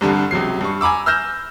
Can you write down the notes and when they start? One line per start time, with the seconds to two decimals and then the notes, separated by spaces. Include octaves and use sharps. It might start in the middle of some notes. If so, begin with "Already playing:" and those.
0.01 C2 G2 D3
0.31 C#2 C3 F#3 C7
0.61 G2 C#6
0.81 G#5 A#5 B5 D6 E6
1.06 E6 F6 G6 A#6 E7